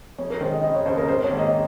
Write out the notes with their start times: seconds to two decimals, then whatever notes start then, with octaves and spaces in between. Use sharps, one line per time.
0.18 F2 C#5
0.30 A#4
0.41 D#3 G#3 C5
0.52 D#5
0.63 F1 D#5
0.75 C#5
0.86 D#2 C#3 C5
0.97 A#4
1.08 G#1 C5
1.23 C#5
1.31 G#2 D#3 A#3
1.39 D#5